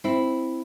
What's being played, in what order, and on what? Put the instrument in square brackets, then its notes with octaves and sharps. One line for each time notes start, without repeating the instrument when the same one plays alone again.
[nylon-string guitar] C4 E4